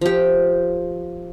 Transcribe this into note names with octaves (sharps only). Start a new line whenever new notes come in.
F3 G4